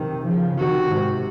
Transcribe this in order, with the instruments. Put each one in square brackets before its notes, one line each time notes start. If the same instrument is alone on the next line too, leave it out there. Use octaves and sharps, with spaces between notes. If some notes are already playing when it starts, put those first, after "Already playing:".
Already playing: [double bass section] C3 D#3
C#3 F3
[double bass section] C3 D#3 [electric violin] F#4
[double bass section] G#2 C3